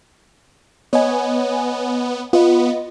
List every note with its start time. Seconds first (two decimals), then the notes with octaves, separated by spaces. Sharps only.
0.93 B3 C#5 D#5 G#5
2.33 B3 F4 D#5